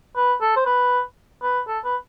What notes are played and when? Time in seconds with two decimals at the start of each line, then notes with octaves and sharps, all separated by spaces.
0.16 B4
0.41 A4
0.56 C5
0.66 B4
1.42 B4
1.68 A4
1.84 B4